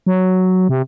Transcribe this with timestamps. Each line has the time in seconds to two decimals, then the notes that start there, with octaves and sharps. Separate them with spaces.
0.06 F#3
0.69 C3